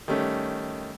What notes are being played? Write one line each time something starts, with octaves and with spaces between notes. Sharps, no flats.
D#3 G3 A3 C#4